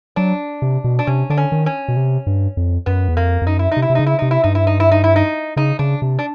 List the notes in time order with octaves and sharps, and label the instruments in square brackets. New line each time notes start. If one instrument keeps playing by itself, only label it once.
[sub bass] F#3 [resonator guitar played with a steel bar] D4
[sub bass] C3
B2
[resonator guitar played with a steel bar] D4
[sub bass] C3 [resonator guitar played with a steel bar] C#4
[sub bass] D3 [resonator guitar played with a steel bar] D4
[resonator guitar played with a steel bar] C#4
[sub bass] D#3
[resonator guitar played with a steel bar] C#4
[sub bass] B2
C3
G2
F2
[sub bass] F#2 [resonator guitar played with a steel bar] B3
[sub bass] E2
[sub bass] F2 [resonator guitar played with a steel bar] A#3
[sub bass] F2
[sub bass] F#2 [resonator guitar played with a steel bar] D#4
[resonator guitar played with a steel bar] E4
D#4
[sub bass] C3
[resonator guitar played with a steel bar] E4
[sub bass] C3
[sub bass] C#3 [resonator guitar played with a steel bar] D#4
[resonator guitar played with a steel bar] E4
[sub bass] C3 [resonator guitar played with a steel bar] D#4
[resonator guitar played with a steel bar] E4
[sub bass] G2 [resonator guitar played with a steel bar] D#4
[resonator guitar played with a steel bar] E4
D#4
E4
D#4
E4
D#4
[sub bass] C#3 [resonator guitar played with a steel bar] D#4
[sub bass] C#3 [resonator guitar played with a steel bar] D4
[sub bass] C3
[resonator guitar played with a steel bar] D4